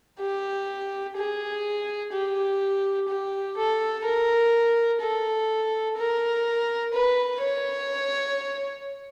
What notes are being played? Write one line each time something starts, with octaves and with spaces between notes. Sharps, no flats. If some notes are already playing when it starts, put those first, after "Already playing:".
G4
G#4
G4
G4
A4
A#4
A4
A#4
B4
C#5